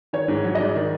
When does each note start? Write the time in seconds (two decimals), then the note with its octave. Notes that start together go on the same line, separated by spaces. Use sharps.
0.13 D#3 C#5
0.28 G#2
0.44 F#3
0.55 D#5
0.60 G#2 D5
0.75 D#3